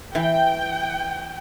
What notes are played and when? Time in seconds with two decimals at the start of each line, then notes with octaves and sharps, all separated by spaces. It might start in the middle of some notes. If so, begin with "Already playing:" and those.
0.15 E3 G5